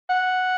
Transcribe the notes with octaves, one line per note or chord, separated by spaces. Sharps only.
F#5